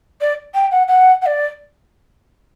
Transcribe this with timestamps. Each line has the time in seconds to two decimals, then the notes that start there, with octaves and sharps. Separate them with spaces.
0.21 D5
0.54 G5
0.71 F#5
0.88 F#5
1.22 F#5
1.26 D5